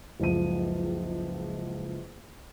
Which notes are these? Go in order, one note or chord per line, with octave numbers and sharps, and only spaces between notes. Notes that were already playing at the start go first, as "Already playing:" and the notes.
F#1 C#2 F3 D#7